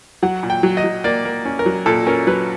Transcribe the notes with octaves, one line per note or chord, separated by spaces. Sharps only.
F#3 F#5
A#2
G5
F#3
D#5
F#3
A#3 D5
A#3
C#4
A#4
F#3
A#2 A4
C#4 A#4
F#3 B4